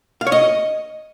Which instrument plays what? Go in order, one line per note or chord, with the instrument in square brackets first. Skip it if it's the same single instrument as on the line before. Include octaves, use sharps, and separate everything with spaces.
[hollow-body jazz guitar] F5
C#5
D#5